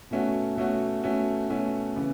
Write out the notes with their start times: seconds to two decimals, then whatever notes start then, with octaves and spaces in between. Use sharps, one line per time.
0.11 B2 A3 C#4 F#4
0.56 B2 A3 C#4 F#4
1.04 B2 A3 C#4 F#4
1.50 B2 A3 C#4 F#4
1.96 C#3 E3 B3